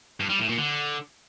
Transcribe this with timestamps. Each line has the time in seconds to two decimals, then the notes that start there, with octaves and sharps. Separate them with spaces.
0.20 G2
0.29 G3
0.39 A2
0.48 A#2
0.58 D3